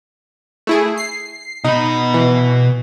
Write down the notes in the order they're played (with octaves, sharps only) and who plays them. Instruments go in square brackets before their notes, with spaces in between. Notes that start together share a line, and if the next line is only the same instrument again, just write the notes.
[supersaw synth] A3 E4 G#4
C7
[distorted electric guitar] B2 B5 [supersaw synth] D#4
[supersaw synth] E3